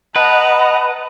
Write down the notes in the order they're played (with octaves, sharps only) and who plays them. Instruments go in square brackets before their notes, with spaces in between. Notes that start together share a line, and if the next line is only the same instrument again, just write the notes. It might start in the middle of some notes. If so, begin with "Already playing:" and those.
[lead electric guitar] B4 [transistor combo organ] D#5 F#5 [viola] A5 A#5